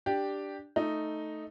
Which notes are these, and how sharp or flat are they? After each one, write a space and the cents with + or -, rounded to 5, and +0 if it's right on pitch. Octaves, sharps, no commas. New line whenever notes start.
D4 +0 G4 +0
A3 +0 D#4 +0